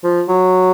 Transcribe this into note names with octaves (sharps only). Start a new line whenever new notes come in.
F3
F#3